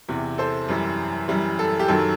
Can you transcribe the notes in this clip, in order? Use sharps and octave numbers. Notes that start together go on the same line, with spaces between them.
E2 C3 E3
A4 C5
F#2 E3 G3
F#2 E3 G3
A4
G4
F#2 D#3 F#3 A4